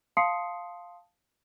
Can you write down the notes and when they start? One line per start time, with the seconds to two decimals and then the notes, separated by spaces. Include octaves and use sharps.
0.17 F5 A5 C6 D#6 C7 C#7